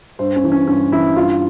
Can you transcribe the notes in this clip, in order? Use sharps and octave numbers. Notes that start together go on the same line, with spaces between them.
G2 C5
C#4
E3
C#4
G2 C#4
E3 E4
G2 F4